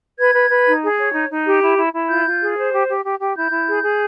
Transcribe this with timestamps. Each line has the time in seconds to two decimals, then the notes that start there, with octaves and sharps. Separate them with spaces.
0.19 B4 G#6
0.34 B4
0.50 B4
0.66 D#4
0.83 G#4
0.98 C#5
1.14 D#4
1.30 D#4
1.45 G4
1.62 E4
1.78 E4
1.93 E4
2.09 F4 G6
2.25 F4
2.41 G#4
2.57 C5
2.73 G4
2.88 G4
3.04 G4
3.20 G4
3.36 E4 G6
3.51 E4
3.68 G#4
3.83 G#4